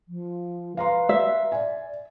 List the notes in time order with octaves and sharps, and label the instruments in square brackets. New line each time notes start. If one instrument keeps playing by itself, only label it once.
[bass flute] F3
[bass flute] B4 [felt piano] F5 A#5 C6
[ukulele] E5
[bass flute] D5 [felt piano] G#5